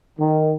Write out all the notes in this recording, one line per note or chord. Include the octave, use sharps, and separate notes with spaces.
D#3